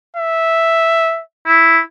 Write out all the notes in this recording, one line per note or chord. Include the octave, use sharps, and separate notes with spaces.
E5
E4